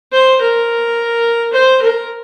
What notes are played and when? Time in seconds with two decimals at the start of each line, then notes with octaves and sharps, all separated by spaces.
0.13 C5
0.41 A#4
1.53 C5
1.82 A#4